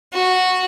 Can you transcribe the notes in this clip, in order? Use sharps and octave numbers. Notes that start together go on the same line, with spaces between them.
F#4